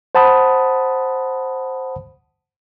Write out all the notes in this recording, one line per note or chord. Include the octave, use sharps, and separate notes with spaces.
C5 F#5 A5 B5 D#6